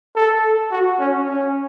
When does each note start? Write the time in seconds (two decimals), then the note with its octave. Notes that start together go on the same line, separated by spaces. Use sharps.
0.16 A4
0.71 F#4
0.99 C#4
1.28 C#4